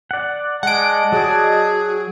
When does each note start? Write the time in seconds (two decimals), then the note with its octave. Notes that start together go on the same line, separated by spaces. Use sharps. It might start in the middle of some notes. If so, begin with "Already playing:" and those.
0.11 D5 F#5
0.63 G#3 D5 D#5 F#5 A5 D7
1.12 F#3 F#4 G#4